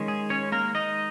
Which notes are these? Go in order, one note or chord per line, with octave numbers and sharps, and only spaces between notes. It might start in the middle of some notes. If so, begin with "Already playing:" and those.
Already playing: D#3 G#3 C#4
G#4
C#4 C#5
A#3 A#4
D#4 D#5